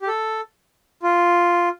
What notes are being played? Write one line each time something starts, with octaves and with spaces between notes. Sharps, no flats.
G4
A4
F4